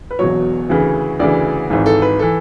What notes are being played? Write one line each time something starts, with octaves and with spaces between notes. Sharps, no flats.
B4
E1 E2 B2 F#3 C#5
D2 C#3 E3
D2 C#3 E3 D5
G#1 G#2 E3
A4
B4
E3 A4